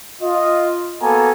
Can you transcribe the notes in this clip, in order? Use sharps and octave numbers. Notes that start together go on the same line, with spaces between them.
F4 D#5
A#3 B3 F#4 A4 G#5 A#5